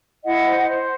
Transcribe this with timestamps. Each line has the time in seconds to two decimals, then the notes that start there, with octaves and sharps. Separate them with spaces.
0.25 E4 D#5 F#5
0.47 C5
0.69 C5